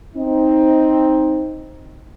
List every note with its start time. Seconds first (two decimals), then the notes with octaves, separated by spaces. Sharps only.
0.16 C4 D#4